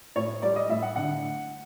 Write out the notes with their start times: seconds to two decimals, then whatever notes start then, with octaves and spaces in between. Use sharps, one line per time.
0.15 A2 C#5
0.42 G3 D5
0.56 D#5
0.69 A2 E5
0.83 F#5
0.96 D3 F#5